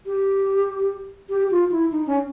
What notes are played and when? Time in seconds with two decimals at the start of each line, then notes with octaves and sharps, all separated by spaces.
0.06 G4
1.29 G4
1.51 F4
1.71 E4
1.92 D#4
2.07 C#4